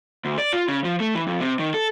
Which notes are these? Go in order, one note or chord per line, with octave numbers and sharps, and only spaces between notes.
D2
D5
F4
C#3
F3
A3
E3
F2
C3
D#3
A4